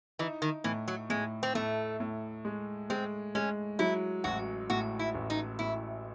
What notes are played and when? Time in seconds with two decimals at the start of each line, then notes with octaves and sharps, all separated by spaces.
0.19 E3 D#4
0.42 D#3
0.64 A2 E3
0.88 F#3
1.10 A2 G#3
1.43 C4
1.55 A2 A3
2.00 A2
2.45 G#3
2.90 G#3 C4
3.35 G#3 C#4
3.79 F#3 E4
4.24 A1 F#4
4.70 A2 F#4
4.99 E4
5.15 A1
5.30 D#4
5.59 A2 E4